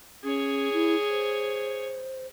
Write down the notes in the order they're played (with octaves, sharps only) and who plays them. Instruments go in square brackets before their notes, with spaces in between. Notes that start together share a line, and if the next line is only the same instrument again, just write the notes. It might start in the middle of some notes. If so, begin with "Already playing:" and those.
[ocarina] C#4 [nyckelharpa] G#4 C#5
[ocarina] E4
C5